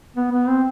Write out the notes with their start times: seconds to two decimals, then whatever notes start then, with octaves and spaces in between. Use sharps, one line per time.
0.16 B3
0.32 B3
0.48 C4